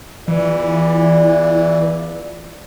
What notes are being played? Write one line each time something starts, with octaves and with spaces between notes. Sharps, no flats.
E2 E3 F4 D5